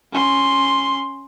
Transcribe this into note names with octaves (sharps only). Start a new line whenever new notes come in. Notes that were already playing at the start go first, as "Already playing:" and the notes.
C#4 C6